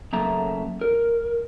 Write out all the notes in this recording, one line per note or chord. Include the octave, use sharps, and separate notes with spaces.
F#2 C#3 A3 A#3 E5 A#5
A#4